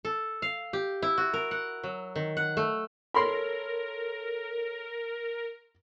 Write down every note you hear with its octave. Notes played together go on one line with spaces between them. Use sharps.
A4
F5
G4
E4
F#4
A#4
F#5
F#3
D#3
F#5
A3
A4 A#4 C#5 B5 C6